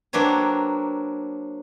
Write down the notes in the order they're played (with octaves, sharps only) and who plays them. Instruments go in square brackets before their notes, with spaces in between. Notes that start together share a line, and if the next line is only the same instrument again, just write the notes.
[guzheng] F#3 A#3 C4 D4 B4 C#5